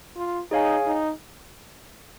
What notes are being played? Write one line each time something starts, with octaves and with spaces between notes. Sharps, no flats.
F4
D#4 G#4 C#5 F5 G#5
D#4